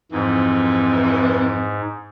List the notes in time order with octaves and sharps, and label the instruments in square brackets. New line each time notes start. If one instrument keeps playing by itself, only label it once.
[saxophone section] F2 E3 [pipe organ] G#2